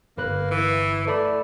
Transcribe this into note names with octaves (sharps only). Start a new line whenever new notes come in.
G1 A#3 B4 F#6
E3
A3 A4 D5 B5